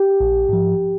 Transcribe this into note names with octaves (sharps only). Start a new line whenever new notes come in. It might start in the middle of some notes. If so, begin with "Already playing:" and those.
Already playing: G4
A#1
G#2 F3